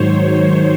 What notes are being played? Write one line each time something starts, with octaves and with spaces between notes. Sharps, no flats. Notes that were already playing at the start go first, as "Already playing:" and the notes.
Already playing: G#2 D#3 F#3 C5 C#5
C5